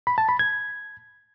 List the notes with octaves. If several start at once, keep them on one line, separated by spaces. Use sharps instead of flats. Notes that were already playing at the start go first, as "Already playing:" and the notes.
B5
A5
B5
G#6